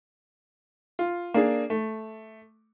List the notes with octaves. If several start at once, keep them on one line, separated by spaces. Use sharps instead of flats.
F4
A#3 D4 G#4
A3